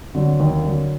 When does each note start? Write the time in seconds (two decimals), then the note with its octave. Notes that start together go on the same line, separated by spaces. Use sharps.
0.15 D3 F#3
0.40 D#2
0.64 D3 F#3